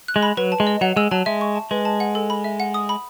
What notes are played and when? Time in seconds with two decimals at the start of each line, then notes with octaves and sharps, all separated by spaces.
0.08 F#6
0.16 G#3
0.23 B5
0.37 F#3 B4
0.52 A5
0.60 G#3
0.67 D#5
0.81 F#3 F#5
0.96 G#3 E6
1.11 F#3 A5
1.26 G#3 E5
1.41 C#6
1.56 A5
1.71 G#3 B4
1.85 A5
2.00 F#5
2.15 A4
2.30 B5
2.44 E5
2.60 F#5
2.74 D#6
2.89 B5